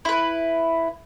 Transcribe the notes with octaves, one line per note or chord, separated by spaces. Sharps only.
E4 B4